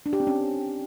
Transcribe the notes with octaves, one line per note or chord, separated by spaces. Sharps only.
D4
G4
C4
C#4